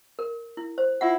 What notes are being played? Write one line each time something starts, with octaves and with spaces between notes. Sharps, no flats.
A#4
E4
C5
E4 F4 F#5